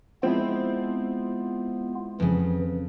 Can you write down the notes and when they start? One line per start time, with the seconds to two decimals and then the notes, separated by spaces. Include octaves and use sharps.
0.23 F3 G#3 B3 C4 E4 F4
2.20 F2 C#3 E3